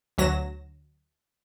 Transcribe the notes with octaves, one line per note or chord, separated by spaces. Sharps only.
D2 F#3 A#6 E7